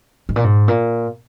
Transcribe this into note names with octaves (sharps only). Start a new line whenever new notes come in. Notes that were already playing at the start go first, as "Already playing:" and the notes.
G#2
A#2
G#2
A#2